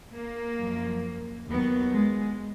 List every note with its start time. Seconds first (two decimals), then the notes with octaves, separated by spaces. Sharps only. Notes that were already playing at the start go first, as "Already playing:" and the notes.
0.14 A#3
0.58 F#2 F3
1.48 D#2 D#3 F#3 B3
1.93 G#3